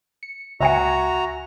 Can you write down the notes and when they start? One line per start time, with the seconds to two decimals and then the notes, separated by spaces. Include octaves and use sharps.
0.23 C#7
0.60 C#2 F#4 E5 G#5 A#5 C#7